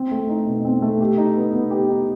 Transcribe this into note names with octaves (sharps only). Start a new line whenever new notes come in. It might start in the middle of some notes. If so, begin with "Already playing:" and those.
Already playing: C4
A3
D#4
B2
C4
A3
G4
D#4
B3
B3
G4
D#4